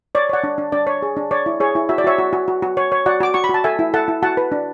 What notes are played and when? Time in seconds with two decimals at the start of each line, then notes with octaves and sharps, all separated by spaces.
0.15 C#5 D5
0.29 C#5 D5 F#5
0.44 D4
0.58 D4
0.72 D4 D5
0.87 C#5
1.02 G#4
1.17 D4
1.31 C#5 D5
1.46 E4
1.60 G#4 C#5
1.75 E4
1.89 F#4 E5
1.98 D5
2.04 F#4 C#5 E5
2.18 F#4
2.33 F#4
2.48 F#4
2.62 F#4
2.77 C#5
2.92 C#5
3.06 F#4 D5 F#5
3.20 F#4 D6
3.34 F#4 C#6
3.44 B5
3.49 F#4 A5
3.64 A4 E5 G#5
3.79 E4
3.94 A4 F#5 A5
4.08 E4
4.23 F#4 F#5 A5
4.37 B4
4.52 D4